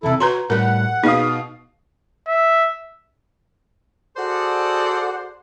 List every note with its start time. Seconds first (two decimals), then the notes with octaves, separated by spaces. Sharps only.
0.03 E2 C3 E4 A4
0.20 F#4 B4 C#5 A#5 C6
0.50 A2 G3 A#4 F#5
1.04 B2 D#4 G#4 B4 F5 D#6
2.27 E5
4.17 F#4 G#4 A4 C5 D5 F#5